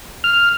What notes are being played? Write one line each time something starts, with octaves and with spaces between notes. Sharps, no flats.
F6